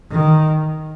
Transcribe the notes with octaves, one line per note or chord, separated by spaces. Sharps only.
D#3